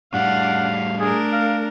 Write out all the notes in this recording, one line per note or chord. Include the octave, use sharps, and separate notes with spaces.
A2 G3 D4 F5 F#5
A3 D4 G#4 A#4
F5